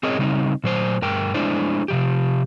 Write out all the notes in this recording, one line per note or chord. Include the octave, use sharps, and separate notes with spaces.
C4 G#4 A#4 C#5 D#5
C#3 G3 C4 D#4
A#2 F#3 C5
G2 A#4 G5
G#3 A3 D4 E4 C5 D5
C3 F3 G4